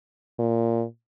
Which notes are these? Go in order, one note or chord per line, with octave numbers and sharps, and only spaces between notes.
A#2